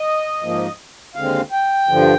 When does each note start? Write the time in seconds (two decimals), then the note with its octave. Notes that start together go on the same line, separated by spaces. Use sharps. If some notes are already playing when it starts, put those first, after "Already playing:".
Already playing: D#5
0.42 G#2 F3 A#3
1.15 D#2 D3 G#3 C4 F5
1.52 G5
1.89 G2 D3 F3